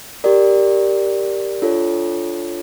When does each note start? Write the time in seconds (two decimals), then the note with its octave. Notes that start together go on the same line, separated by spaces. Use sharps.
0.24 G4 A#4 D5
1.62 D4 F4 A4 C#5